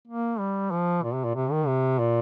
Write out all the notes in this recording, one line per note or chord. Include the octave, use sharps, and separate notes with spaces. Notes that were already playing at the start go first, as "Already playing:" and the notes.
A#3
G3
F3
A#2
C3
A#2
C3
D#3
C3
A#2